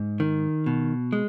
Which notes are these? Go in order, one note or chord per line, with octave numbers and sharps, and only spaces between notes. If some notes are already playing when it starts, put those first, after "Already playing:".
Already playing: G#2
D#3
B2
G#3